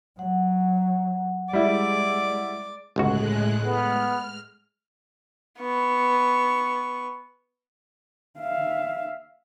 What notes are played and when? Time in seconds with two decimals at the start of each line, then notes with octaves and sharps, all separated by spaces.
0.19 F#3 F#5
1.53 G3 G#3 E4 D5 D6
2.96 G1 C#2 A2 G#3 F#4 F#6
3.65 B3 F6
5.60 B3 C#6
8.40 E5 F5